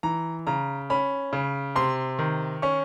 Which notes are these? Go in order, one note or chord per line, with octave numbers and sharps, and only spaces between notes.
E3 A#5
C#3 A#5
C#4 B5
C#3
C3 C6
D#3
C#4 C#6